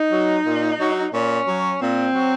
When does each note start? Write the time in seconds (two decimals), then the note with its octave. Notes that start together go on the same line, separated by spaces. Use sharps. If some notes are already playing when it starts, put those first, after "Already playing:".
Already playing: D#4
0.11 F#3
0.45 A#2
0.79 F#3
1.12 A#2 C#4
1.46 F#3
1.80 A#2 C4
2.14 F#3